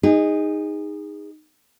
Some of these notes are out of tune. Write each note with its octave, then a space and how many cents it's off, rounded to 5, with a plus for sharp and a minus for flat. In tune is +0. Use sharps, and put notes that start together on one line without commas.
D#4 +0 G#4 -25